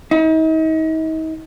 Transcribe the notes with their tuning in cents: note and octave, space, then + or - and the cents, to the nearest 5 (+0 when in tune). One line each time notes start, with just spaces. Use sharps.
D#4 +40